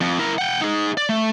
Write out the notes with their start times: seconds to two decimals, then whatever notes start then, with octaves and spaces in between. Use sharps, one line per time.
0.01 F2
0.19 E4 A#4
0.38 F#5 G5
0.61 D#4 G#4
0.97 D5
1.09 A3